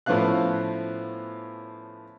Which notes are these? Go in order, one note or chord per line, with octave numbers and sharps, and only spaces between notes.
A2 F3 B3 C#4 F5 F#6